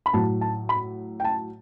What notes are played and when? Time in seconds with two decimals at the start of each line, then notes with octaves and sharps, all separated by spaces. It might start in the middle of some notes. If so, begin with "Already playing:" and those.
0.06 B5
0.14 A2 F#3 A5
0.41 A5
0.69 B5
1.20 G5
1.24 A5